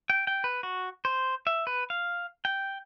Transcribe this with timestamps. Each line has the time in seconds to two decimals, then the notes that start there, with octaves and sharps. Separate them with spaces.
0.10 G5
0.27 G5
0.44 B4
0.63 F#4
1.05 C5
1.47 E5
1.67 B4
1.90 F5
2.45 G5